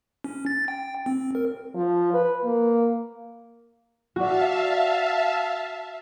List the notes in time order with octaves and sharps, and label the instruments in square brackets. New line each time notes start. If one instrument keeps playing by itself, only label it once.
[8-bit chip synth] C#4
A6
G5
C4
A#4
[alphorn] F3
B4
A#3
[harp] F#4 D5 [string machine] E5 F5 A5